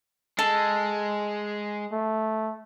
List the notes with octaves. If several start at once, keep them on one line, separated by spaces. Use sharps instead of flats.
G#3 A4
A3